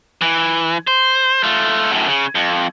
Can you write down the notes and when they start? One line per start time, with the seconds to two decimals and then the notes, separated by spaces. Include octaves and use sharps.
0.22 E3
0.87 C5
1.43 A3 F4
1.91 F#2 A2
2.08 C#3
2.35 F2